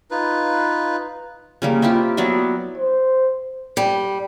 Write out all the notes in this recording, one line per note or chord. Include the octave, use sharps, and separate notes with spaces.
D#4 F4 B4
C#3 G3 A#3
C4 E4 F4 G4
F#3 B3 D5 E5
C5
G3